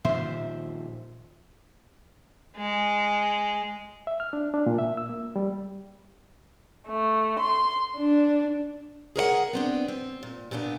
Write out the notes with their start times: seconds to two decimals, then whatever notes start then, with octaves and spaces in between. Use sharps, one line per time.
0.05 A#2 D#3 F3 C5 E5
2.57 G#3
4.07 E5
4.20 F6
4.33 D4
4.54 D4
4.66 A#2
4.78 E5
4.97 E6
5.09 A#3
5.36 G3
6.88 A3
7.40 C6
7.97 D4
9.16 G#4 A#4 C#5 F#5
9.53 B3 C4 D4
9.88 C4
10.23 A#2
10.51 A#2 C#3 B3 C#4 D4